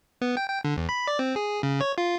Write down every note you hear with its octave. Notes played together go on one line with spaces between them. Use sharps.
B3
G5
G5
D3
E2
B5
D5
C4
G#4
C#3
C#5
F4